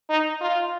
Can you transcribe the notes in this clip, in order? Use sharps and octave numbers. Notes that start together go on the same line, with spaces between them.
D#4
F4